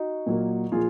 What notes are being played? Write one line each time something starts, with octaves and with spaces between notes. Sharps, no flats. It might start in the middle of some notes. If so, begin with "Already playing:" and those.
Already playing: D#4 F#4
A#2 F#3 A#3
A#2 F3 F4 G#4